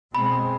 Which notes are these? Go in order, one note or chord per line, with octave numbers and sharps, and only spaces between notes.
B2 G#3 C4 B5